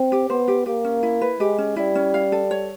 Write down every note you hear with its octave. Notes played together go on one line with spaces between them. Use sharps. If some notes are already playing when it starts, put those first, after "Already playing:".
Already playing: C4
G4
B3 C5
G4
A#3 G4
C#4
E4
B4
G#3 G4
C#4
G3 E4
C#4
F5
A4
C#5